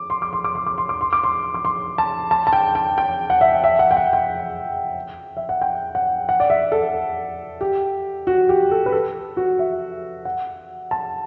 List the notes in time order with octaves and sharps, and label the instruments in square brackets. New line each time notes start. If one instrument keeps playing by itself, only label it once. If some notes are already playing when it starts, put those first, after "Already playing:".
Already playing: [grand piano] D6
C6
D6
C6
D6
C6
D6
C6
D6
C6
D6
C6
D6
C6
A5
A5
A5
G5
G5
G5
F#5
E5
E5
F#5
G5
F#5
G5
E5
F#5
G5
F#5
F#5
D5
E5
A4
G4
F#4
G4
A4
B4
A4
F#4
E5
F#5
A5